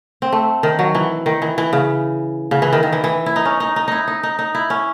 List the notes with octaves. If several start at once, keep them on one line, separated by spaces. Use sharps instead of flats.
C4
A3
D#3
F#3
E3
D#3
E3
E3
C#3
C#3
E3
D#3
D#3
E3
E3
E4
D#4
C#4
D#4
D#4
D#4 E4
D#4
D#4
D#4
E4
C#4